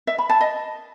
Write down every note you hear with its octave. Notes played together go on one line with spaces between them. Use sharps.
E5
B5
A5
D#5